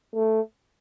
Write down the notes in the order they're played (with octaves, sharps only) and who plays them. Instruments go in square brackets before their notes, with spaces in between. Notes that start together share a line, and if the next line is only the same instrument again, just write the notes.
[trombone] A3